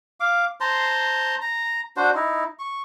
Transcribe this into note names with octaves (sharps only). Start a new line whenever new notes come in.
F5 D6
C5 A5 A#5 C6
A#5
D4 F#4 C5
D#4 E4
C#6